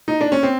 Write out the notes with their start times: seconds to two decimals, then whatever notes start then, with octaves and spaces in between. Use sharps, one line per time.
0.08 D#4
0.21 D4
0.32 C#4
0.43 C4